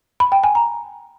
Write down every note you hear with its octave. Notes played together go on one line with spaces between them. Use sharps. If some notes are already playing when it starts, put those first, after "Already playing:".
B5
G5
G#5
A#5